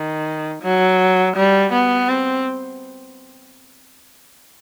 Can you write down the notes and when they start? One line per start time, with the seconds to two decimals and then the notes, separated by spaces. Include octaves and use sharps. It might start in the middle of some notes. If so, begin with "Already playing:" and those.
Already playing: D#3
0.62 F#3
1.36 G3
1.72 B3
2.09 C4